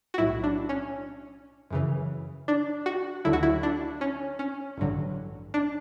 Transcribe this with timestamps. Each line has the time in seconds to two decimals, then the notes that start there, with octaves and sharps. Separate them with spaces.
0.14 F#4
0.18 B1 A2 F#3 E4
0.44 D4
0.69 C#4
1.70 F#2 C#3 E3
2.48 D4
2.86 F#4
3.25 D2 D3 F#3 E4
3.33 F#4
3.43 E4
3.63 D4
4.01 C#4
4.39 C#4
4.77 A1 G2 D3 F#3
5.54 D4